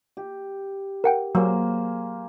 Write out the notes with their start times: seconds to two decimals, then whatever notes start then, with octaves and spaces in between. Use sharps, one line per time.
0.17 G4
1.04 A#4 F#5 G5
1.35 F#3 A#3 G#4 C5